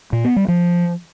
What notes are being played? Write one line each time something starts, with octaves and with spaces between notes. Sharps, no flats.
A#2
B3
G3
F3